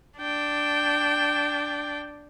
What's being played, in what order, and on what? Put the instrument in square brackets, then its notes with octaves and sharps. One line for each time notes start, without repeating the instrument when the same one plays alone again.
[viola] D4 G5